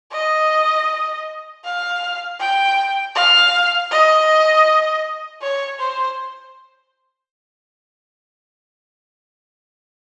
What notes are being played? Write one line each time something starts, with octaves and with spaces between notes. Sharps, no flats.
D#5
F5
G5
F5
D#5
C#5
C5